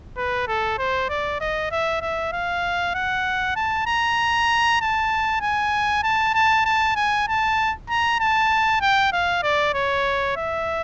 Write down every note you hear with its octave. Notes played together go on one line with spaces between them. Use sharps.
B4
A4
C5
D5
D#5
E5
E5
F5
F#5
A5
A#5
A5
G#5
A5
A5
A5
G#5
A5
A#5
A5
G5
F5
D5
C#5
E5